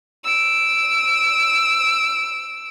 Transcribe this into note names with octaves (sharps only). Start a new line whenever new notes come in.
E6 D7